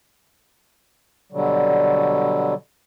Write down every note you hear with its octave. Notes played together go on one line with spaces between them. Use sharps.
B2 D3 F#3 G3